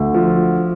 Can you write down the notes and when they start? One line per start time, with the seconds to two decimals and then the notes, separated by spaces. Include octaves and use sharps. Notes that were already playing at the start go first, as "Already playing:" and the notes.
Already playing: D2
0.14 F3